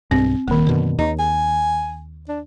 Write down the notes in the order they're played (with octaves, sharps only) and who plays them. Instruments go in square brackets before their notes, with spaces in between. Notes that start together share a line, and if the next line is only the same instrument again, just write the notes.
[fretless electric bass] B1 G2 [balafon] C4
[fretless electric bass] D#1 [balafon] D#3 A#3
[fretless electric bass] F#2 B2 D3
[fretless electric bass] D#2 [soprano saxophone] D#4
[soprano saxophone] G#5
D4